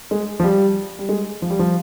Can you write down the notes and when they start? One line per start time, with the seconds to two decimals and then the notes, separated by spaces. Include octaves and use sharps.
0.11 G#3
0.40 F3
0.44 G3
0.99 G3
1.09 G#3
1.42 F3
1.50 G3
1.59 F3